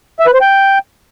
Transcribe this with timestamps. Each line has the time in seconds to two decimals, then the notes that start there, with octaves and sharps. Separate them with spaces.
0.19 E5
0.27 B4
0.34 C5
0.41 G5